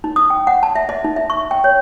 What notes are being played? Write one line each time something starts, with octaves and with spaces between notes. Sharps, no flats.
D#4
D#6
G5
F#5
A5
E5
D#5
D#4
E5
C#6
G5
C#5